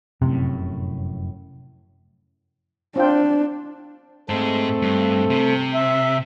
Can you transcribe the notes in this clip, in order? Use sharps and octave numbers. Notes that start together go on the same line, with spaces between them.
F1 F#2 A2 C3
C4 D4 F4 G5
G#2 G#3 A3 C4 A4
G2
C3
E5